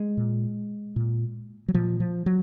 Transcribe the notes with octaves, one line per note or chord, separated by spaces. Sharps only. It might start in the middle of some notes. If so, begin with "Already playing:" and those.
Already playing: G#3
A#2
A#2
F#3
A#2 F3
F3
F#3